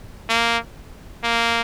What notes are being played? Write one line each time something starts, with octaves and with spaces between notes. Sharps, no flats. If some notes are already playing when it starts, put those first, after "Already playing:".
A#3
A#3